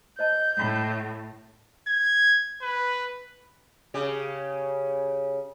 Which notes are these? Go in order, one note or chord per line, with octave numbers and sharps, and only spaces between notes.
C5 D#5 A5 G6
A2
G#6
B4
C#3 G4